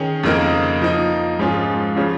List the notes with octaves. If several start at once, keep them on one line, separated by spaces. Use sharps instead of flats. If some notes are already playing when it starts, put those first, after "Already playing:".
Already playing: D#3 C#4 G#4
F2 C#3 A#3 D#4 A#4
F3 A#3 D#4
G#2 F3 C#4 F4 G#4
C#3 F3 C#4